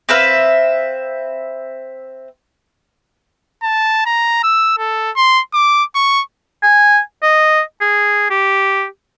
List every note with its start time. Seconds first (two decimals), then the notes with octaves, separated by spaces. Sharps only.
0.09 C4 B4 E5 F5
3.63 A5
4.06 A#5
4.43 E6
4.78 A4
5.16 C6
5.54 D6
5.95 C#6
6.63 G#5
7.23 D#5
7.81 G#4
8.30 G4